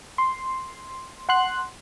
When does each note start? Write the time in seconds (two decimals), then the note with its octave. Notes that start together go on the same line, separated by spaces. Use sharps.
0.18 C6
1.29 F#5 C6 F#6